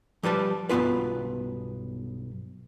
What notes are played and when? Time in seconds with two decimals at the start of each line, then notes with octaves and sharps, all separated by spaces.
0.23 F3 G3 B4 A5
0.69 B1 G2 B3 F4 B4